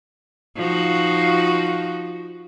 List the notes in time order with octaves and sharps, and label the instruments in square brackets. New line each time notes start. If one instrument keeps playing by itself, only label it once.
[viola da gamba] F3 D#4 F#4